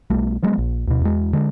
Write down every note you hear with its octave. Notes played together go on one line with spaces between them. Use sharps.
B1 G3 A3
F3 F#3 G#3 B3
A#1
D2 B2
E2 G#3
D3 G#3